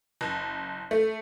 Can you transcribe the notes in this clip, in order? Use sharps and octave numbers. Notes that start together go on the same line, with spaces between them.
F#1
A3